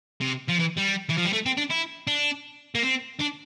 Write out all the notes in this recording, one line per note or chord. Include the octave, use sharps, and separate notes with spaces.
C3
F3
E3
G3
E3
F3
G3
A3
C4
D4
E4
D4
A#3
C4
D4